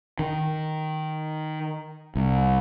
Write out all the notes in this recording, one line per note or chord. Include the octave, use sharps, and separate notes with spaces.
D#3
C2